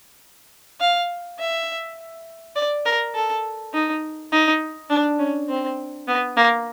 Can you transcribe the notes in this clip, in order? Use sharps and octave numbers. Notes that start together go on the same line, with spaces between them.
F5
E5
D5
A#4
A4
D#4
D#4
D4
C#4
C4
B3
A#3